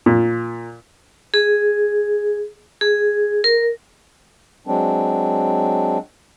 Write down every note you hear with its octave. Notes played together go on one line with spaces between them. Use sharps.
A#2
G#4
G#4
A#4
F#3 G#3 C4 D4